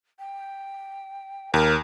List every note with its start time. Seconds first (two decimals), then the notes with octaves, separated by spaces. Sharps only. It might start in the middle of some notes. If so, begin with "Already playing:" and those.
0.19 G5
1.54 D#2 A#4